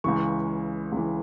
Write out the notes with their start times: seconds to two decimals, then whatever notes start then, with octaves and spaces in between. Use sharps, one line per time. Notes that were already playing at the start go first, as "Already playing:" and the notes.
0.04 C#2 C#3 E3 C#6
0.92 C#2 C#3 E3